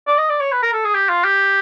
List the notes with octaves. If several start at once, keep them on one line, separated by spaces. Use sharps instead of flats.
D5
D#5
D5
C#5
B4
A#4
A4
G#4
G4
F4
G4